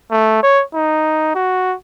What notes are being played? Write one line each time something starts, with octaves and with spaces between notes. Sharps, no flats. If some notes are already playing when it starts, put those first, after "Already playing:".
A3
C#5
D#4
F#4